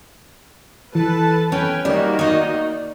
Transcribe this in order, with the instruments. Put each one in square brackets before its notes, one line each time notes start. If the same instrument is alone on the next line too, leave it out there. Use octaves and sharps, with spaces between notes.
[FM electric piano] E3 [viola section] A4 B4 A5
[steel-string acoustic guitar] C#4 [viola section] B4 G5 G#5
[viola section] D#3 A#3 F#4 [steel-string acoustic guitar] G3 [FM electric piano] D5
[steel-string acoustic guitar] D#4 D#5